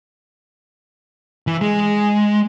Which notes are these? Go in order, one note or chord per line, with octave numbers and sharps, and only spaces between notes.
E3
G#3